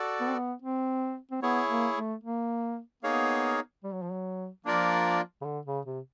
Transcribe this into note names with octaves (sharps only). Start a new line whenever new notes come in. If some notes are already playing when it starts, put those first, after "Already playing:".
Already playing: F#4 A4 D5
B3
C4
B3
C4
C4
B3 E4 G#4 C#5
A#3
A3
A#3
A#3 B3 D#4 G#4 C#5 F5
G3
F#3
F3
F#3
F3 A#3 D4 F4 A#4 D5
C#3
D3
C#3
C3